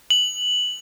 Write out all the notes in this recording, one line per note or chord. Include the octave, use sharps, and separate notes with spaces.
F#7